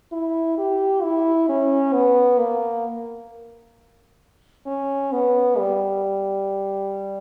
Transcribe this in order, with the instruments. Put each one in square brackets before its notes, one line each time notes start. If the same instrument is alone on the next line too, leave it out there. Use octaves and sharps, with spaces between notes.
[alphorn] E4
G4
E4
C#4
B3
A#3
C#4
B3
G3